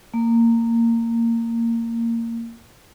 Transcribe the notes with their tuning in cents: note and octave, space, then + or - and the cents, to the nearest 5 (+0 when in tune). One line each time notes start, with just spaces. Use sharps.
A#3 -20